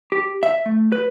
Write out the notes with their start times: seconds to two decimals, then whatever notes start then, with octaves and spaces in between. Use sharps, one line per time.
0.12 G4
0.43 E5
0.66 A3
0.92 B4